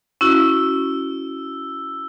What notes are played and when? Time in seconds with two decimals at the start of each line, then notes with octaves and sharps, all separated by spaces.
0.21 C#4 E4 F#4 E6